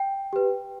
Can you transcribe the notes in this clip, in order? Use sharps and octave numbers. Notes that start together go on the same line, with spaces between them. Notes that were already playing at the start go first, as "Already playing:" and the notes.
Already playing: G5
G4 B4